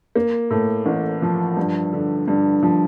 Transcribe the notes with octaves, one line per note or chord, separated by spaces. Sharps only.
A#3
A2
A1
F3
G2
D3
G2
F3